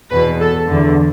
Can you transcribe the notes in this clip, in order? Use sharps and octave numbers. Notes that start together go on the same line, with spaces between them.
E2 B2 B4
A4
E2 D3